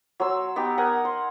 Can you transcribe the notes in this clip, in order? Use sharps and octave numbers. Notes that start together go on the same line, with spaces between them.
F#3 C6 E6
B3 D#4 G4
A#4 F#5 G#5
C6